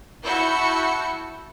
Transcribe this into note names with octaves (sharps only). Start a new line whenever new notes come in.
E4 F#4 A5 E6 G6 C#7